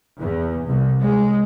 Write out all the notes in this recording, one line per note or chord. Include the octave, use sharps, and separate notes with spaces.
E2
C2
G#3